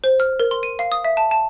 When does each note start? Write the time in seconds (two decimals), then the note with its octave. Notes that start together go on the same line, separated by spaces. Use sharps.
0.04 C5
0.20 F6
0.40 A#4
0.51 C6
0.63 D#7
0.79 F5
0.92 D#6
1.04 E5
1.17 A5
1.31 A5